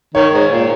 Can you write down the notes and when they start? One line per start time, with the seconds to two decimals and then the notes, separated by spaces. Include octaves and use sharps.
0.14 D#3 C#5
0.33 G#2
0.51 A#2